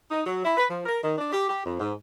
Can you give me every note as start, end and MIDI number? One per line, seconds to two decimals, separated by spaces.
0.11 0.21 63
0.26 0.40 54
0.43 0.53 64
0.57 0.64 71
0.69 0.83 53
0.85 0.98 70
1.02 1.17 51
1.18 1.32 62
1.32 1.44 67
1.48 1.61 67
1.64 1.77 41
1.79 1.92 44